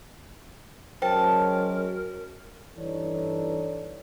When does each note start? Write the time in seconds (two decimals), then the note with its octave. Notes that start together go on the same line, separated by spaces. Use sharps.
1.02 F#3 G#3 C#4 A#4 C5 G5 A5
2.76 G2 E3 D#4 A4 C#5 D5